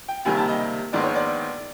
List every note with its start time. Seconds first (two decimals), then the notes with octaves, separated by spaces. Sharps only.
0.08 G5
0.25 C#2 C3 D#3 G3 A#3 G#5
0.37 A5
0.48 D#5
0.93 A#1 G#2 D#3 G#3 B3 D5
1.04 C#5
1.16 D5